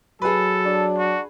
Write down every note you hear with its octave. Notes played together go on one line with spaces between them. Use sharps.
F#3 G#4 A4 B4
D4
F#4